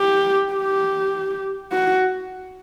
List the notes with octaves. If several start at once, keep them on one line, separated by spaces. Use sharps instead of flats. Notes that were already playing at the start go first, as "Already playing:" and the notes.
Already playing: G4
G4
F#4